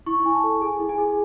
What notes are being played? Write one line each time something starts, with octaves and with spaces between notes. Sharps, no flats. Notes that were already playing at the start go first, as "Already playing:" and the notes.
E4 C#6
E4 G#5
A5
A4
G#4 G#5
E4
G#5
G#4